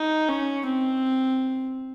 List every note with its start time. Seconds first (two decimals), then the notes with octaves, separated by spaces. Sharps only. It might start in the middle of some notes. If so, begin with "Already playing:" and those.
Already playing: D#4
0.29 C#4
0.66 C4